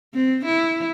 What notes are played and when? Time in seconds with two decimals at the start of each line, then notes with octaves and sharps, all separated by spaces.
0.14 C4
0.46 E4